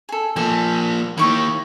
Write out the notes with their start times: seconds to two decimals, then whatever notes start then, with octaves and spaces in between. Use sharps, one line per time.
0.09 G#4 A4
0.36 F3 A#3 A4 G#5
1.18 D#3 A#3 E4 G5 C#6